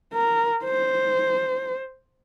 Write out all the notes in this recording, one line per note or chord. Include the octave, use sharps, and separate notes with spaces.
A#4
C5